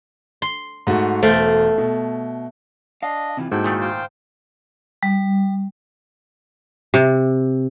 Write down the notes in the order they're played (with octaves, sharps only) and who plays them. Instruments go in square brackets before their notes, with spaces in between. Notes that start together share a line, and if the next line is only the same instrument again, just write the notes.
[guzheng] C6
[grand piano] G#2 A3 F#4
[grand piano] E1 C5 [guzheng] A3 F5 G5
[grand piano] B2
[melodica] D4 D#5 [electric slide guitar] F5
[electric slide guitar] C3 E3 F4
[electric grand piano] G#2 [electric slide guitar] A#3 E4 F#4 [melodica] A4 G5
[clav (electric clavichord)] A#2 D#3 A3
[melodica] C5 F5 G5
[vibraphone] G3
[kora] C3